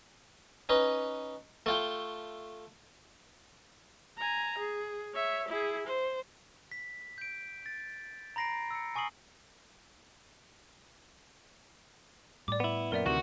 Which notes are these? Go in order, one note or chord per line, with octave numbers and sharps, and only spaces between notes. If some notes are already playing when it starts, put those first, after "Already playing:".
C#4 D#4 B4
A3 F4 G5
G#5 A#5
G#4
C#5 E5
E4 G#4
C5
B6
G6 D7
A6
A#5 B5 A#6 C7 D7
E6 C#7
G#5 C#6 D#6 C7 F#7
A2 G3 D5 D6
B3 E4
F#2 A#2 B3 A#4 D5 E5
D2 C3 D#3 E3 F#4